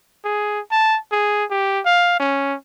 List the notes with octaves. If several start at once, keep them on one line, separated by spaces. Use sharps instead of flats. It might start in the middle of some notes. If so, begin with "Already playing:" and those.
G#4
A5
G#4
G4
F5
C#4